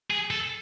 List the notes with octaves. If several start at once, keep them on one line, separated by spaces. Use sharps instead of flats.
G#4
A4